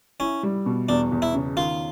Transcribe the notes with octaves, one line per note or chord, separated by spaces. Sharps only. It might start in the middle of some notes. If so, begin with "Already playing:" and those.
C#4 E4
G3
B2
E2 D4
E2
E4
C#3
D#3 F4